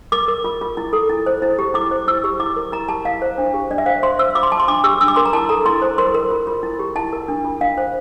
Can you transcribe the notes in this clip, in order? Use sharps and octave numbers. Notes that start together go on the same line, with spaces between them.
A#4 D6
A#4
F4
F4
E4
A4
E4
C5
E4
G4
E4 D6
C5
E4 E6
G4
E4 D6
A#4
E4 A#5
G4 A5
E4 F5
C5
D4
G4
D4 D5
E5
C5 F5
C5 C6
C5 E6
F4 D6
C6
F4 A5
C6
D4 D6
G4 E6
D4 E6
D6
A#4 C6
A#5
E4 A5
A4 A#5
E4 C6
C5
A#4 C6
A#4
F4
F4
E4
G4
E4 A5
A#4
D4
F4
D4 F5
C5